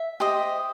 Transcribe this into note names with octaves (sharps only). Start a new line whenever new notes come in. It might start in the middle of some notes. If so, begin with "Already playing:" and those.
Already playing: E5
G4 C5 D#5